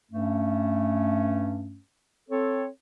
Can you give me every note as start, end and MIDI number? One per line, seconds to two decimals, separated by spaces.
0.12 1.79 43
0.12 1.79 57
0.12 1.79 61
2.29 2.66 60
2.29 2.66 69
2.29 2.66 73